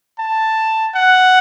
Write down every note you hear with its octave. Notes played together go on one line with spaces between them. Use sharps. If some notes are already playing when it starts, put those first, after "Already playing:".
A5
F#5